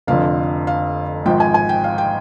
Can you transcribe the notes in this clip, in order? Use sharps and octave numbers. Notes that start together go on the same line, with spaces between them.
F1 F2 D3 F5
F5
G#1 G#2 F3 G5
G#5
G#5
G5
F5
G5